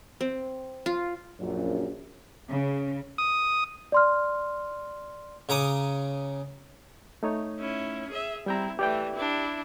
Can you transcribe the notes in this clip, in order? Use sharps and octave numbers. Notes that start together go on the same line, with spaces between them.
C4
F4
A#1 F#2
C#3
D#6
D5 C6 F6
C#3 A#5 D6 D#6
A3 D#4 C#5
C#4 E4
G#4 E5
G3 C4 E4 G5 A#5
E3 A3 G4 D5 G5
D4 E4